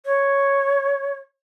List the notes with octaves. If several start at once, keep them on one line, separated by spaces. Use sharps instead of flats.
C#5